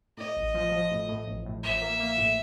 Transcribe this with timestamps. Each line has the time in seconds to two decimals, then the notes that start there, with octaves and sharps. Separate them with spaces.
0.17 A2 D#5
0.36 A1
0.54 F3
0.72 F3
0.91 A2
1.08 A2
1.27 A1
1.45 A2
1.63 A1 E5
1.81 A#3
2.00 A#3
2.18 A2